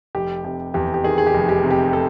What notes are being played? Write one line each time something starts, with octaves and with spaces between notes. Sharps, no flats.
F1 G4
C3 G4
E2 G4
G4
D#3 G#4
G#4
G4
F1
G4
C3
G4
A4